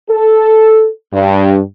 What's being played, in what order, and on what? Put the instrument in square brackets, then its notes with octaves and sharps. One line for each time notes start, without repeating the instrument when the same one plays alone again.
[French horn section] A4
G2